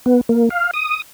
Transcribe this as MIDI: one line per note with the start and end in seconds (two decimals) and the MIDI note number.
0.06 0.21 59
0.29 0.49 58
0.50 0.71 77
0.74 1.02 87